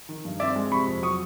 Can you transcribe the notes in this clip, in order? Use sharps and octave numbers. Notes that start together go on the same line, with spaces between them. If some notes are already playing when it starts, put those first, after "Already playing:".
D#3
G2
C4 D5 E5
G#3
C3 B5 C#6
F2
F#3 C#6 D#6